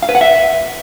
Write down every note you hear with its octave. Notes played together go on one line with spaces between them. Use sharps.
F5
B4
F#5
E5